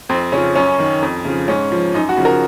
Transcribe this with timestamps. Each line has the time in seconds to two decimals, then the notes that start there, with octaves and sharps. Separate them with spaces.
0.09 F2 C4
0.32 C#3 C#4
0.36 F3
0.55 F#2 C#4
0.79 D#3
1.02 F2
1.25 C#3 F3
1.48 G#2 C#4
1.72 F3
1.94 F#2 D#4
2.09 F#4
2.17 C#3 F3
2.25 A#4